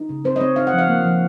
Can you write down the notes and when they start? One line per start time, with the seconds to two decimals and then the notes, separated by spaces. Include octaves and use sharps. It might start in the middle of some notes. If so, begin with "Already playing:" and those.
Already playing: D#4
0.09 C#3
0.24 C4 C5
0.36 D#5
0.40 C4 C#5
0.56 D#4 F5
0.67 F#5
0.73 F3
0.78 F5
0.89 A#3
1.04 F3